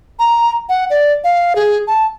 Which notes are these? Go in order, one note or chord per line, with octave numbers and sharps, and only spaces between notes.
A#5
F#5
D5
F5
G#4
A5